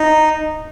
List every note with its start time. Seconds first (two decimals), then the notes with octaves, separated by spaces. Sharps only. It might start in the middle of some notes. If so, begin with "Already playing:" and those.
Already playing: D#4